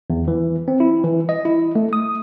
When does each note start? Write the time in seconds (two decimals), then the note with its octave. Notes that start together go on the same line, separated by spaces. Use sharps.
0.10 E2
0.28 E3
0.68 C4
0.80 E4
1.04 E3
1.29 D#5
1.45 E4
1.75 A3
1.93 D#6